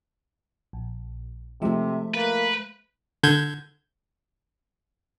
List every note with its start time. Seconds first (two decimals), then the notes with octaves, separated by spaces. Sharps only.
0.73 A#1
1.62 C3 F3 G#3 A3 E5
2.14 A#3 B4
3.23 D3 G6 G#6